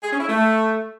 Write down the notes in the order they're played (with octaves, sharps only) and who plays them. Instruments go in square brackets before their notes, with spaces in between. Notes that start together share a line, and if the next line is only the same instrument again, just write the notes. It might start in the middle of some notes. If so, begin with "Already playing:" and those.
[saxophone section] G#4
C#4
E4
A3